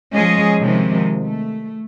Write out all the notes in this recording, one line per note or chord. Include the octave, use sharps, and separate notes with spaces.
F3 G#3 C#4 G#4 D#5
C3 D#3 F3 G#3
A3